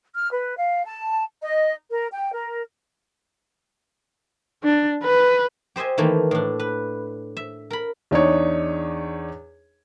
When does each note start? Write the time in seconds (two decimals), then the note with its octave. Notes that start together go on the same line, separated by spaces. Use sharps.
0.14 F6
0.31 B4
0.57 F5
0.85 A5
1.42 D#5
1.90 A#4
2.11 G5
2.33 A#4
4.63 D4
5.04 B4
5.76 G4 C5 D#5 E5 G#5
5.98 D#3 E3 A3 A#3
6.31 A2 D4
6.59 B4
7.37 E5
7.70 A#4 B5
8.11 E2 D4 D#4 C#5